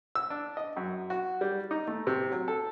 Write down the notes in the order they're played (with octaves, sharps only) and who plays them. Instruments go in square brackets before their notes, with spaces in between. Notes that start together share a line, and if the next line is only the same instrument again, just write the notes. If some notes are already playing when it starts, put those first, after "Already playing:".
[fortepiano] E6
D4
D#5
F#2
F#4
G3
D#4
A3
C3
F#3
A4